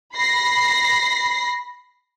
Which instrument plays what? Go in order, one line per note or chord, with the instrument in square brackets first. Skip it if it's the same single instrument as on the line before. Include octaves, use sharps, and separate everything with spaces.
[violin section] B5 A#6 C7